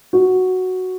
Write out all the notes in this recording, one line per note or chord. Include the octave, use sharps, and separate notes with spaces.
F#4